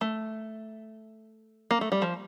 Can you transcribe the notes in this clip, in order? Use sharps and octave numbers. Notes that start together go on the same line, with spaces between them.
A3
A#3
A3
G3
F3